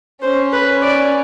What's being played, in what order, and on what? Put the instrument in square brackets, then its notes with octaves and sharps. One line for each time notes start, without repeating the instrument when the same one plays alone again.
[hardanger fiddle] C#4 [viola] C5
[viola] B4
D5